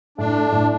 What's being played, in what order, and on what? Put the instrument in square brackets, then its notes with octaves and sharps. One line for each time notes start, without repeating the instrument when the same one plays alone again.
[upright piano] A2 [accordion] D4
[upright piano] A3
A2